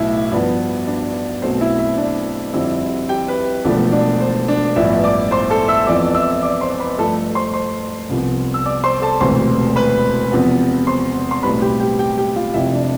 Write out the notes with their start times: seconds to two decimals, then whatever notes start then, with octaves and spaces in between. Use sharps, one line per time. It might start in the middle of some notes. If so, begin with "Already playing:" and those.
Already playing: B1 A2 B3 E4 E5
0.32 G2 F3 B3
0.87 D4 D5
1.42 B1 B2 A3 C4 C5
1.61 E4 E5
1.79 E4 E5
1.97 D4 D5
2.53 F2 D3 G3 C4 E4 E5
3.09 G4 G5
3.28 B4
3.64 E1 E2 D3 F3 A3 D4 D5
3.92 D4 D5
4.20 C5
4.48 D4 D5
4.76 A1 G2 F3 B3 E4 E5
5.04 D5 D6
5.31 C5 C6
5.50 A4 A5
5.68 E5 E6
5.87 F2 E3 B3 D5 D6
6.15 E5 E6
6.42 D5 D6
6.61 C5 C6
6.80 B4 B5
6.98 G2 F3 A3 A4 A5
7.35 C5 C6
7.53 C5 C6
8.10 C2 C3 F3 B3
8.54 E6
8.66 D5 D6
8.84 C5 C6
9.02 A4 A5
9.20 E1 D2 C3 E3 C5 C6
9.76 B4 B5
10.32 E2 C3 F3 B3
10.87 C5 C6
11.31 C6
11.43 B1 A2 G3 C4 B4 B5
11.62 G4 G5
11.80 G4 G5
11.99 G4 G5
12.18 G4 G5
12.36 F4 F5
12.54 F1 F2 C3 E4 E5
12.73 D4 D5